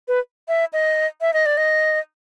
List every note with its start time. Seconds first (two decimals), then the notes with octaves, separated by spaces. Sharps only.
0.08 B4
0.48 E5
0.73 D#5
1.21 E5
1.34 D#5
1.46 D5
1.57 D#5